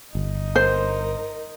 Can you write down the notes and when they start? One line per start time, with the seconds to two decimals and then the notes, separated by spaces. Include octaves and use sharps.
0.15 G1 D#4
0.56 A#4 C5